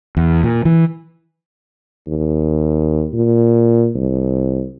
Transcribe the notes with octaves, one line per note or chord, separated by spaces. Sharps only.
E2
A#2
E3
D#2
A#2
C2